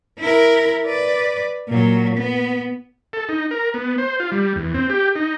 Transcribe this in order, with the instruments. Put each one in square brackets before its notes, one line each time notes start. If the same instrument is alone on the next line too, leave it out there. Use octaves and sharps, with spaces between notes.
[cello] E4 A#4
B4 D5
A#2 F#3
B3
[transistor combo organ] A4
D#4
A#4
B3
C5
F4
G3
E2
C4
G4
D#4